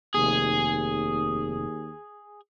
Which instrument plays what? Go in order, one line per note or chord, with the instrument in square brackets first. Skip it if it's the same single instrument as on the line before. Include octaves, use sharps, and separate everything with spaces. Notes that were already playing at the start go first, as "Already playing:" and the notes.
[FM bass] F1 [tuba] D#2 [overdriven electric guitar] G#4